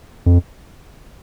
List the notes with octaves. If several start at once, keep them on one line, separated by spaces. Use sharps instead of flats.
F2